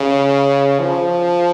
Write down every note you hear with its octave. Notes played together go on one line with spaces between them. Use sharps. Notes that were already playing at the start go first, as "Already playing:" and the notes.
Already playing: C#3
F3